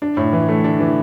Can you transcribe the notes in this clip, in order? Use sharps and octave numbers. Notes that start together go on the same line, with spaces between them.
D4
A2
E3
A3
D4
E3